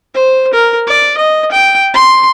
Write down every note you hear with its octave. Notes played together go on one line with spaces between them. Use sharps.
C5
A#4
D5
D#5
G5
C6